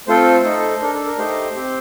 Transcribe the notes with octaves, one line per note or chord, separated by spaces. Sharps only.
A3 C4 F4 A4 C5
A3 D#4 A4
D4 A4 A#4
A4
A#4
A3 D#4 G4 C5
C4 G4